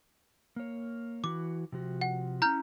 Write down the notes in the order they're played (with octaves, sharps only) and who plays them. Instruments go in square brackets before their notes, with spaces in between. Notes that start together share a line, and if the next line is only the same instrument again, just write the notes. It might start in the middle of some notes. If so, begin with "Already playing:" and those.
[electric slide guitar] A#3 C#5
[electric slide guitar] E3 F#4 [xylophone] D6
[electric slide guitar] C3 F3 F#4
[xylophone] F#5
[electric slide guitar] C#4 E4 [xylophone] A#5 F6 G6